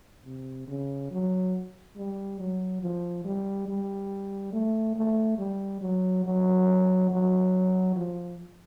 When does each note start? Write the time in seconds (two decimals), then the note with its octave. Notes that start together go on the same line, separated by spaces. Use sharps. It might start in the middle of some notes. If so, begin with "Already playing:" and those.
0.25 C3
0.68 C#3
1.11 F#3
1.97 G3
2.40 F#3
2.82 F3
3.24 G3
3.68 G3
4.53 A3
4.96 A3
5.38 G3
5.81 F#3
6.25 F#3
7.10 F#3
7.96 F3